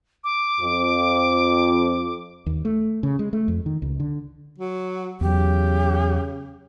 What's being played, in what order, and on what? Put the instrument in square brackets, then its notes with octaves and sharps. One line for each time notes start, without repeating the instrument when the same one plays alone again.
[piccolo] D6
[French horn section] F2
[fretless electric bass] D#2
A3
C#3
G#3
A3
F2
D#3
C#2
D3
[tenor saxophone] F#3
[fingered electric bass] E2 F#3 [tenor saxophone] C#3 [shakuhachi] G4